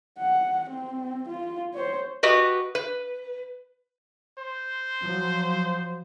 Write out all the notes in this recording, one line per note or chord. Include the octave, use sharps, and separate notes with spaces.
F#5
C4
F4
C5 C#5
F#4 G4 B4 D#5
B4
C5
F3 F#3